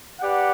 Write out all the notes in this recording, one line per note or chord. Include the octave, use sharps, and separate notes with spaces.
G4 B4 D5 F#5